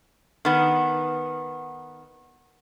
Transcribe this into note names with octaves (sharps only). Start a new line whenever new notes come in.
D#3 B3